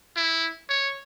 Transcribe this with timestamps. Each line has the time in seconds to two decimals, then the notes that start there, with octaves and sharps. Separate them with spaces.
0.16 E4
0.69 C#5